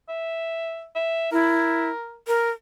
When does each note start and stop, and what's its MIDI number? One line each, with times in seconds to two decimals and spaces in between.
0.09 0.87 76
0.95 1.31 76
1.32 1.89 64
1.32 2.18 70
2.27 2.50 70